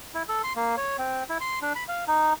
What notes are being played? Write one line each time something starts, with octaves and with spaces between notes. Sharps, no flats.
E4
A4
C6
A#3
C#5
C4
E4
C6
D4
B5
F5
D#4